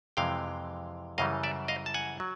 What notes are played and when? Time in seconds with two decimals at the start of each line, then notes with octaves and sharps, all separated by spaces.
0.17 F2 C3 E3 G#3 F5 G5
1.18 F#2 C#3 E3 G3 D#5 F5
1.43 D5 E5
1.68 D#5 F5
1.86 A5
1.94 F#5 G#5
2.20 F#3